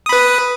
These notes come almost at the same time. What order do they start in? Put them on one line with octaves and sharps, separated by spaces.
D#6 B5 B4